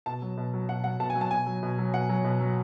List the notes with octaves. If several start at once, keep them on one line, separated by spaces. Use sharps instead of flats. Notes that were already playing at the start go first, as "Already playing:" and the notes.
B2 A5
F#3
B2
F#3
B2 F#5
F#3 F#5
B2 A5
G#5
F#3
A5
B2 G#5
F#3
B2
F#3
B2 F#5
F#3
B2
F#3